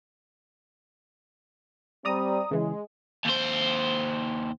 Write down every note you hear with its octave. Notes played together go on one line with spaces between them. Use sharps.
G3 C4 D5 A#5 D#6
C#3 E3 G#3
D#2 C5